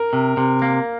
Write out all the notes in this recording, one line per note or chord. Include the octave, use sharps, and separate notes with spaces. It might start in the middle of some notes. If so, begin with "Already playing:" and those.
Already playing: A#4
C3
C3
A#3